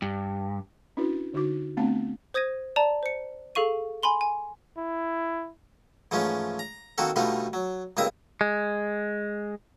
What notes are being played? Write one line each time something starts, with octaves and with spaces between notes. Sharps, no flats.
G2
C#4 D4 E4 F#4 B4
D3 D#4 F#4 D6
A3 B3 C4 D4 F5 A5
C5 D#6 G#6 A#6 D#7
D5 A5 A#5
C5 C#7
G#4 A4 F5 C#6 D#7
G#5 B5 C6 G7
G#5
E4
G#2 E3 F3 A3 C#4
A#5
D#3 A#3 C4 F#4 A4
B2 D3 G3 A3 D#4 F4
F#3
C#2 G2 A#3 C4 E5 D#6
G#3